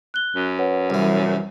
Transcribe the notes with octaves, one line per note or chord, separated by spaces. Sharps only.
F#6 G7
F#2
B4 C#5 F#5
C2 E3